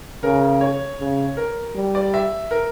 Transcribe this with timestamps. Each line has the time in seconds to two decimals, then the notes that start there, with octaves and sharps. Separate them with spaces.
0.23 C#3 A#4
0.61 C#5
0.99 C#3
1.37 A#4
1.75 G3
1.95 D5
2.14 E5
2.51 A#4